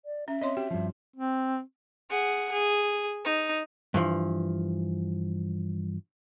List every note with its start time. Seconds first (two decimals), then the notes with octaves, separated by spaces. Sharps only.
0.05 D5
0.28 C#4 E5
0.41 C4 C#5 D#5 C6
0.57 F#4 G4
0.71 G2 F3
1.16 C4
2.10 G#4 F#5
2.52 G#4
3.25 D#4
3.94 G2 E3 F3